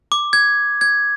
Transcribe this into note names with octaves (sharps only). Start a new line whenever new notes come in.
D6
G#6
G#6